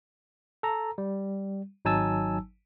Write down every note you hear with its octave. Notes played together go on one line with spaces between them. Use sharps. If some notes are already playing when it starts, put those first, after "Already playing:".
A4 A#5
G3
G#1 F#3 D#4 G#5 A5 E6